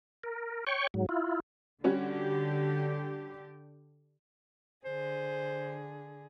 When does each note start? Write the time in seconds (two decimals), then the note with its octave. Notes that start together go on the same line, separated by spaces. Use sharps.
0.24 A#4
0.67 C#5 G5 C#6
0.94 G#2 F#3
1.09 E4 F4
1.84 D3 G3 C#4 F#4 G4
4.85 D3 G#4 C5